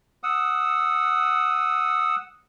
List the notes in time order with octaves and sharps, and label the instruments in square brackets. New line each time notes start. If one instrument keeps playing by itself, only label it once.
[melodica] F#5 D#6 E6